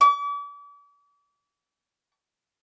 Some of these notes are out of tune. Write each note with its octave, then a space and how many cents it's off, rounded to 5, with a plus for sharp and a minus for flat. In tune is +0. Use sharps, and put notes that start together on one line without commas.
D6 -40